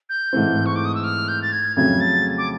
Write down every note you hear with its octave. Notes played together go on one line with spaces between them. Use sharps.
G6
G#2 E3 A3 C4
C#6
D6
D#6
E6
F6
G6
A6
G#6
F2 C#3 F#3 A3 G#6
A6
D6